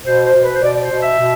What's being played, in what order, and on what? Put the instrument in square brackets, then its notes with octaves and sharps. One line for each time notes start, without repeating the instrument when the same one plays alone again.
[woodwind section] B2 C5
C5
B2
B4
C5
B2 D5
D5
C5
B2
E5
B2